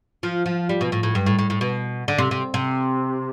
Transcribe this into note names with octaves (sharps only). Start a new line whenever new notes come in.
F3
F3
G3
B2
A2
A2
G2
A2
A2
A2
B2
D3
C3
C3
C3